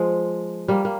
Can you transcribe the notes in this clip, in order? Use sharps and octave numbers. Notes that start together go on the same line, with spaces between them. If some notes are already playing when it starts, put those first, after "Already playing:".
Already playing: F3 G#3
G3 A#3
A#3